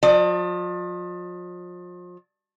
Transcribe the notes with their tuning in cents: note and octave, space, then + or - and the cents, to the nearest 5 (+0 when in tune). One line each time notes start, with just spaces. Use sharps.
F3 +35 D5 +45